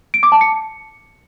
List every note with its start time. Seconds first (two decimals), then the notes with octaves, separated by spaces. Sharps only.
0.14 D7
0.23 D6
0.32 A5
0.41 C#7